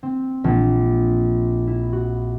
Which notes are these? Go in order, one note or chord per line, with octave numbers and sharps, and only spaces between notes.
C4
A#1
E4
F#4